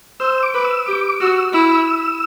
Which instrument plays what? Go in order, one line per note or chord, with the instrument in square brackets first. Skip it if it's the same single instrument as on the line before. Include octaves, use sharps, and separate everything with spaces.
[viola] C5 [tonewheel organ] E6
[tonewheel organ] D6
[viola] B4
[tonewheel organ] E6
[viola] G4 [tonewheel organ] D6
[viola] F#4 [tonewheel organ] E6
[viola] E4 [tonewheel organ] E6